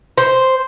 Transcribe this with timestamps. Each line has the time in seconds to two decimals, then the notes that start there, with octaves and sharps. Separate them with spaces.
0.18 C5